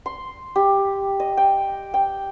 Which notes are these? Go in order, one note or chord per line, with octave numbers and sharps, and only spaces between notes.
C6
G4
D#5
G5
G5